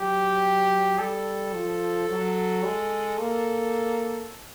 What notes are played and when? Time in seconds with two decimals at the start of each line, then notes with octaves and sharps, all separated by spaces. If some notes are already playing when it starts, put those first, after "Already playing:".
Already playing: F#3 G4
0.98 G3 A4
1.53 F3
2.09 F#3
2.64 G#3
3.18 A#3 A4